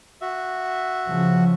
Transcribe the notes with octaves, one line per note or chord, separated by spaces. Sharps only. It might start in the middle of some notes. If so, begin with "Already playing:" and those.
F#4 E5
C#3 F3